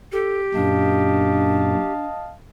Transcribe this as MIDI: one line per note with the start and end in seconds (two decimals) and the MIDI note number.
0.12 1.93 67
0.12 0.39 69
0.55 1.75 42
0.55 1.75 46
0.55 2.06 62
0.55 2.33 75
0.55 2.33 77
0.55 2.33 81